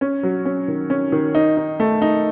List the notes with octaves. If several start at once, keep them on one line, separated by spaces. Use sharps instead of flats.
C#4
F#3
C#4
D#3
C#4
D#3
D#4
D#4
A3
D#4